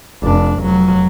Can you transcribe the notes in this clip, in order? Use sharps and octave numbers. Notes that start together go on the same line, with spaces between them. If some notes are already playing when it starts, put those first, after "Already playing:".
F1 D4
F1 F#3